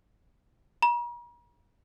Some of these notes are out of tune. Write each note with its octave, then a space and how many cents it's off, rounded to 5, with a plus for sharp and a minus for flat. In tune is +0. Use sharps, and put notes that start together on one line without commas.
A#5 +45